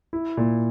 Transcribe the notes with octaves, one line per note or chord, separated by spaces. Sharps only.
E4
A#2